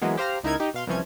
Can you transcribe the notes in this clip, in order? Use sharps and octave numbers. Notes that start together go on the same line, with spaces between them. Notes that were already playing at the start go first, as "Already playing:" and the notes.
E3 F#3 G#3 A#3 B3
G4 C5 F5 A#5 F6
C#2 D#4 E4 A#4 G#6
D#4 G4
B2 F5 C6
C2 E3 F3 C#4 G#6